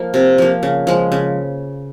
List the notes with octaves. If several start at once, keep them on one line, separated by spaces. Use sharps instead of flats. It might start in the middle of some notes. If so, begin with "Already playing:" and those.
Already playing: F3 A#3
C3
F3 A#3
C#3
F3 G#3
C#3